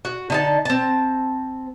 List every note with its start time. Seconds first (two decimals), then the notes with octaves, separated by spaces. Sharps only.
0.05 F#4
0.30 D3 D#4 A5
0.65 C4 A5